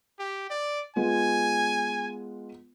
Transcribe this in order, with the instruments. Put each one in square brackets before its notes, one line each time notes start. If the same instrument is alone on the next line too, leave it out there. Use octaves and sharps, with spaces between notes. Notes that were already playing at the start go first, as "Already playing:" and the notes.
[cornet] G4
D5
[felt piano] G#3 B3 F4 [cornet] G#5